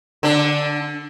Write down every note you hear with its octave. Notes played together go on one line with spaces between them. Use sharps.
D3 D4